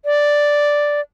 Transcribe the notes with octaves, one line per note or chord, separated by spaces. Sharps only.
D5